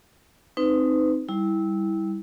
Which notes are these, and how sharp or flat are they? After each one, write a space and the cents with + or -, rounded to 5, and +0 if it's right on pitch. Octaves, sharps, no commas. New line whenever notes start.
C4 +0 D#4 +0 B4 +35
G3 +0 E4 -20